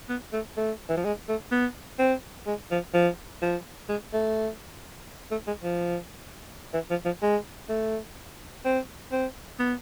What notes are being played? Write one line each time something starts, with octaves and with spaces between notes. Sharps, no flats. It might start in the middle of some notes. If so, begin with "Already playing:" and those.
B3
A3
A3
E3
F3
G#3
A3
B3
C4
G#3
F3
F3
F3
G#3
A3
A3
G#3
F3
E3
F3
F3
G#3
A3
C4
C4
B3